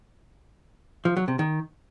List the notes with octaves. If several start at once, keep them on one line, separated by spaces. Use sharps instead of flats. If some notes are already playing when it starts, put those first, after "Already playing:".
F3
F#3
C3
D#3